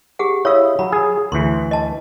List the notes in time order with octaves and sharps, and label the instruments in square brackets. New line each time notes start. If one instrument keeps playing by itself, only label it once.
[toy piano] G4 G#4 F#5
[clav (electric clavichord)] E4 D#5 [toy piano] C#5 F5
[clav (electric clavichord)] F#3 [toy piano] B5
[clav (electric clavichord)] G#4
[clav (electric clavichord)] D2 E3 [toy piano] C6
[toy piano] D#5 A5